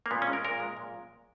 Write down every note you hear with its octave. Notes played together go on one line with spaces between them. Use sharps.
A#3
A#2 B3
C#4
G#3
A#4
A#2 A#4
G#3
A#2